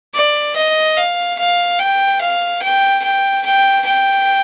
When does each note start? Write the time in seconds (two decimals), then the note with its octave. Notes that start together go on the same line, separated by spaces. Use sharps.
0.14 D5
0.56 D#5
0.97 F5
1.39 F5
1.79 G5
2.21 F5
2.62 G5
3.04 G5
3.45 G5
3.86 G5